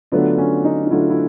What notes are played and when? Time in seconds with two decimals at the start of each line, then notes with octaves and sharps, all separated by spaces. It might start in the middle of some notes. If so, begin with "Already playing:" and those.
0.12 D3 F#3 A3 B3 D4 F4
0.38 C#4
0.65 D#4
0.86 D#4
0.91 D3 F#3 A3 D4 E4 F4
1.10 E4